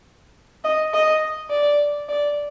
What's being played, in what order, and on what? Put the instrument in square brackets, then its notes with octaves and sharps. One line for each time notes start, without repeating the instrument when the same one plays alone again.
[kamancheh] D#5
D#5
D5
D5